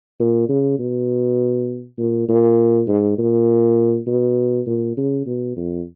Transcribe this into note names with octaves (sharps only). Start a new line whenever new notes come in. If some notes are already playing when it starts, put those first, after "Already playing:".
A#2
C#3
B2
A#2
A#2
G#2
A#2
B2
A#2
C#3
B2
F2